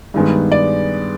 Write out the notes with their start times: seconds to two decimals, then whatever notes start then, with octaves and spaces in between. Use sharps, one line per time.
0.14 G2 D#3 G#3 B3
0.52 D5